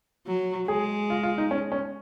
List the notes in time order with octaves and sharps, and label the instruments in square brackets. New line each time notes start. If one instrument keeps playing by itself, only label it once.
[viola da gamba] F#3
[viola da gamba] G#3 [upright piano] G#4
[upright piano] F4
F4
D#4
C#4
C#4